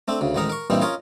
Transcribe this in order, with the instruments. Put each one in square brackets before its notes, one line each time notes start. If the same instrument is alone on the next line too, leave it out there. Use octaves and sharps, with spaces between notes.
[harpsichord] A3 C4 D4
D2 C#3
A1 G#2 D#3 D#4 A#4 A#5
A#4 C#6
G2 A#2 E3 G3 C4 D#4
C#4 F4 A#4 C#5 D#5